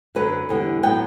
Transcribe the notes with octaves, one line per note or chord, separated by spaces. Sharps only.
F#2 D3 F#3 B4
E2 D3 G3 B3
A2 F#3 B3 G5